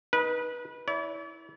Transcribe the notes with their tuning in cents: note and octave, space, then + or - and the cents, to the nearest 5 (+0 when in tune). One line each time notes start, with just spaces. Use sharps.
D#4 +15 B4 -25
E4 -10 D5 -45